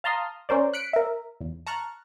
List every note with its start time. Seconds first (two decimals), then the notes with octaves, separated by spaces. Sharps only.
0.04 F5 A5 A#5 C6 D#6 F6
0.49 C#4 A#4 C5 D5
0.73 F#6 B6 C#7 D7
0.93 A#4 E5
1.41 E2
1.67 A5 A#5 C#6 F6 F#6